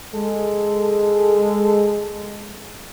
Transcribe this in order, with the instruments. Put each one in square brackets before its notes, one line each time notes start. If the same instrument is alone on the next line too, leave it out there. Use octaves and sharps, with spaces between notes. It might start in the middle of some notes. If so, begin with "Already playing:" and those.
[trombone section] G#3 A4